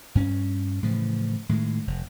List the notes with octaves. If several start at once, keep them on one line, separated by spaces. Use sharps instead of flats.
G2 C#4
A2 C#3 E3 F3
A2 D#3 G#3
F1